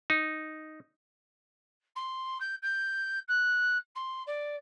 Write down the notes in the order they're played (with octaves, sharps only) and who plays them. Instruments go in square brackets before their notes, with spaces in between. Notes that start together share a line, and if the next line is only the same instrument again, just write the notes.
[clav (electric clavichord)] D#4
[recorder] C6
G6
G6
F#6
C6
D5